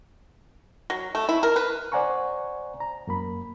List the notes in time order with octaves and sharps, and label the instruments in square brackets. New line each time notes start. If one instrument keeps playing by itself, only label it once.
[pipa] F#3
A3
E4
A#4
B4
[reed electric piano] C5 D5 F#5 G#5 A#5 C#6
A#5
F#2 A#3 B5